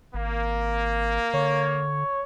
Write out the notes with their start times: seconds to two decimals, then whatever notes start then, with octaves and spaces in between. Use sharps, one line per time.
0.14 G#1 A#3
1.34 D3 C#5